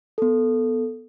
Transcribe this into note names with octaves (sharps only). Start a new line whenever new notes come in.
B3 A4